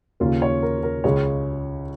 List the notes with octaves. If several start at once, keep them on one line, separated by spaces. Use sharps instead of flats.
D#2 C#3 A#3 C#4 F4
C#5
A#4
A#4
C#2 C#3 G#3 C#5